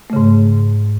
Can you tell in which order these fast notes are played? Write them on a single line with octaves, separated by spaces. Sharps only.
A3 C#3 G#2